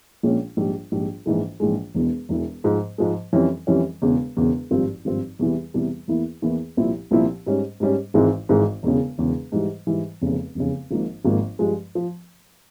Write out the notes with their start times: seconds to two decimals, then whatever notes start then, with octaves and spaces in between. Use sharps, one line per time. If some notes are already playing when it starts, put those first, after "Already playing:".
0.23 A#1 A#2 G#3 C#4
0.57 A#1 G#2 G3
0.92 A#1 G#2 G3
1.26 A#1 G#2 E3 G#3
1.60 A#1 G#2 E3 G#3
1.94 E1 E2 E3
2.29 E1 E2 E3
2.64 G#2 F3 G#3
2.98 G#2 F3 G#3
3.33 F2 E3 G3 C#4
3.67 F2 E3 G3 C#4
4.02 E1 E2 C#3
4.37 E1 E2 C#3
4.71 G#1 G2 F3 C4
5.05 G#1 G2 F3 C4
5.39 E2 C3 E3 G3
5.74 E2 C3 E3 G3
6.08 E2 E3 A#3 E4
6.42 E2 E3 A#3 E4
6.77 C2 A#2 F3 C4 E4
7.11 C2 A#2 F3 C4 E4
7.46 G#2 G3 C#4
7.80 G#2 G3 C#4
8.14 G#1 G#2 E3 G#3 C4
8.49 G#1 G#2 E3 G#3 C4
8.83 E1 E2 C#3
9.18 E1 E2 C#3
9.52 G#2 E3 G3
9.87 G#2 E3 G3
10.22 F1 E2 C#3
10.55 F1 E2 C#3
10.91 G#1 G#2 F3 A#3
11.25 G#1 G#2 F3 A#3
11.59 G2 F3 G#3
11.95 F3